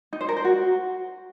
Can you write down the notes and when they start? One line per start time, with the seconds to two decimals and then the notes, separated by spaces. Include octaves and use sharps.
0.13 D#4
0.21 C5
0.29 A#4
0.36 C5
0.44 F#4